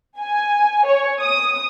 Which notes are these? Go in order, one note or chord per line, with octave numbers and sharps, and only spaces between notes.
G#5
C#5
D#6